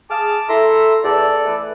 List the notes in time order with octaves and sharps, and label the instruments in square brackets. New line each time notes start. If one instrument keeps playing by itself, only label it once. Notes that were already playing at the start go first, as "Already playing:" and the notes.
[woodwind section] G#4 F6 [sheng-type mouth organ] A5 D6
[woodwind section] E4 A4 [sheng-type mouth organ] E5 A#5 C6
[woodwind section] E2 [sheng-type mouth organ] A4 D5
[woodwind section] E3 A3 B4